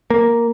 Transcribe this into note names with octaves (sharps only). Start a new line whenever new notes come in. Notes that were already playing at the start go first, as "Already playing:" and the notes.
A#3